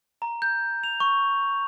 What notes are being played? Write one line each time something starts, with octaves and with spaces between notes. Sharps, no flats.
A#5
G6
F7
C#6